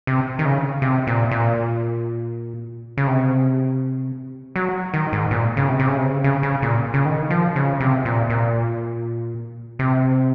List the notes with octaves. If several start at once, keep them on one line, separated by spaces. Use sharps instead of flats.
C3
D#3
C#3
C3
A#2
A#2
C#3
C3
F#3
D#3
G#2
A#2
C#3
C3
C3
C#3
C3
C#3
C#3
C#3
A#2
C#3
D#3
F3
C#3
C3
A#2
A#2
C3